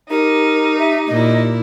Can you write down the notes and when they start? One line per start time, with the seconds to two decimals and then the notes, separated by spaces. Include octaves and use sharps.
0.10 D#4 G4 A#4
0.79 E5
1.08 A#2 E4 D#5